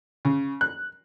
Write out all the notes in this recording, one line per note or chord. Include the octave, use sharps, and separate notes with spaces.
C#3
F#6